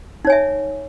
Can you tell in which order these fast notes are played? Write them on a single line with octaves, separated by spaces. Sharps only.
D#4 C#5 G#5 E5